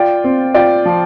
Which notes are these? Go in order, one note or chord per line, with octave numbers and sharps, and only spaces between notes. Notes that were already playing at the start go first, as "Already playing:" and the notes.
Already playing: F4 D5 G5
C4
F4 D5 G5
F3